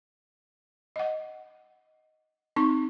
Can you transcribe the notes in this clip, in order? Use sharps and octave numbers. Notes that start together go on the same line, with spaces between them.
D#5 F#5
C4 D#4 C#6